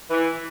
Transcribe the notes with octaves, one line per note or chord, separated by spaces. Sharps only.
E3